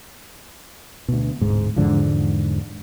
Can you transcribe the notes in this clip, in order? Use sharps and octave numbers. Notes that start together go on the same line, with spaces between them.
D2 B2
D1 G#2
E2 G#2 D3 F3